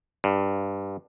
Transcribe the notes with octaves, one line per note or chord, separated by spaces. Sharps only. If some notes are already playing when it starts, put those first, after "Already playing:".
G2